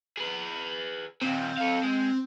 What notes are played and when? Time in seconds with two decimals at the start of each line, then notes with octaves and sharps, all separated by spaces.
0.17 G#4 B4
1.21 D#2 A#2 C4
1.57 A4 F5
1.84 G#3